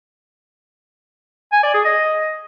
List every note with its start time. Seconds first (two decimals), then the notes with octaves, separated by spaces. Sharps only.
1.52 G#5
1.63 D5
1.74 G#4
1.85 D#5